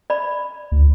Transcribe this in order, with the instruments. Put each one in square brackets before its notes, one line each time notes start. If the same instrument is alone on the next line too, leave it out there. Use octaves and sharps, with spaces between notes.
[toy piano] D5 B5
[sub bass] D2